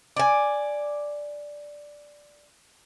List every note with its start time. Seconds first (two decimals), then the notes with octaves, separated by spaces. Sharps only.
0.17 D5 G#5